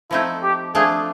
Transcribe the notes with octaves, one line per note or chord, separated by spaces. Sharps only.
F3 A3 C4 D#4 E4
G4
F3 A3 D4 G#4